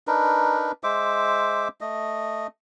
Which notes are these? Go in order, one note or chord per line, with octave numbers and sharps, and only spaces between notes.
D4 D#4 A#4 B4
G#3 C5 E5 D6
A3 D#5